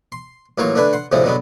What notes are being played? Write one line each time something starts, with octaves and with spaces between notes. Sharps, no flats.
C6
A1 F#3 A#3 F4 C#5 C#6
D3 A3 D4 B4 G#5
F#5 C6
D2 A2 C3 F3 G#3 C4
B2 D3 F#3 G#3 B3